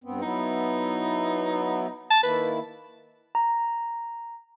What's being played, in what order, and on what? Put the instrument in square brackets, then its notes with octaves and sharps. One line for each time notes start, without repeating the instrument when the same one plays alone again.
[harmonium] G2 B3 C4
[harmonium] F#3 B3 E4 [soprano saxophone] D#4
[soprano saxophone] A5
[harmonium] D#3 A#3 E4 [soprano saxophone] B4
[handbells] A#5